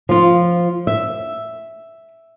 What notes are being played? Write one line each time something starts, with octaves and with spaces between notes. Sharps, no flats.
F3 F4
E5